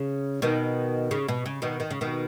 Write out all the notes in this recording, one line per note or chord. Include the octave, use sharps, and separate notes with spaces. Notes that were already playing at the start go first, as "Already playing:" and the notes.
Already playing: C#3
B2 D#3
C#3
B2
C#3
B2 D#3
D#3
C#3
B2 D#3